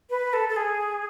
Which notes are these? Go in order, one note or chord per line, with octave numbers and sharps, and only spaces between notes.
B4
A4
A4
G#4